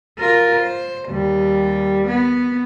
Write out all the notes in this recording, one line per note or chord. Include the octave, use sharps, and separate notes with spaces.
F4 A#4
C5
D#2 G3
B3